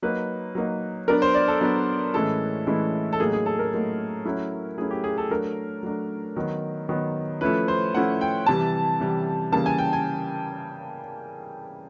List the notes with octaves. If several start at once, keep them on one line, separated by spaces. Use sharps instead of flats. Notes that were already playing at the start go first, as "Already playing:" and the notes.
F#3 A#3 D#4 B4
F#3 A#3 D#4
F#3 B3 D4 A#4
C5
D5
A4
F#3 B3 D4
A2 E3 G#3 C#4 E4 A4
A2 E3 G#3 C#4 E4
A4
A2 F#3 A#3 D#4 G#4
G#4
A4
A#4
A2 F#3 A#3 D#4
F#3 A3 C#4 E4
F#3 A3 C#4 E4 G#4
G4
G#4
A4
F#3 A3 D4 A#4
F#3 A3 D4
D#3 F#3 B3
D#3 F#3 B3
F3 A3 C#4 E4 B4
C5
F3 A3 C#4 E4 F#5
G5
C3 E3 G3 A5
C3 E3 G3
C#3 E3 G3 A#3 A5
G#5
G5
G#5